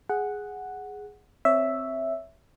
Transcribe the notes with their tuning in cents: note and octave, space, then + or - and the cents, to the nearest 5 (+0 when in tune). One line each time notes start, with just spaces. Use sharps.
G#4 +0 F#5 +0
C4 +0 C#5 +15 E5 +0